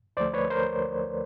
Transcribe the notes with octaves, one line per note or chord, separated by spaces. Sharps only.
D2 D3 F3 A3 C5 D5
B4 C#5
A#4 C5